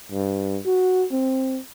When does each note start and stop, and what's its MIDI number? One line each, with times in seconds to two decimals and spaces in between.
0.12 0.59 43
0.65 1.05 66
1.11 1.59 60